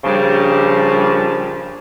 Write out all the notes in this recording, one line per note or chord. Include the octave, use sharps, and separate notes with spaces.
G2 A#2 C#3 F3 G3